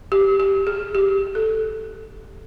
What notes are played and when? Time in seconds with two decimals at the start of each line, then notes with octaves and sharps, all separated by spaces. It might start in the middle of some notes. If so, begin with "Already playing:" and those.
0.12 G4
0.40 G4
0.67 G#4
0.95 G4
1.35 A4